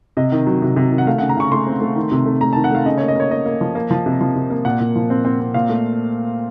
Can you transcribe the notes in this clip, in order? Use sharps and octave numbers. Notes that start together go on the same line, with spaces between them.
C3 D#5
D#3
F#3
C3
C3
D#3
F#5
A3 F5
C#3 F#5
A#5
C#3 C#6
A3 C6
C4
A3
D#3
C3
A3
A3 A#5
D#3 A5
F#5
A3 F5
C#3 D#5
A#3 C#5
D#5
A#3 C#5
A#3 D#5
A#3
F3
A#3
F3
C3
F3
C3
A#3
A#2 F#5
A#2
F3
C4
C4
C4
A#2 F5
A3